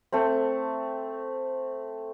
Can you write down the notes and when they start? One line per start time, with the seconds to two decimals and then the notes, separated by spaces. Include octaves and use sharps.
0.12 A3 C4